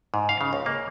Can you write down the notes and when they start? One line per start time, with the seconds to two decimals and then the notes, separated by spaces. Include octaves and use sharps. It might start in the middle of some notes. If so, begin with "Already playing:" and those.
0.14 G#2
0.29 F5
0.41 C#3
0.53 C#2
0.66 A#3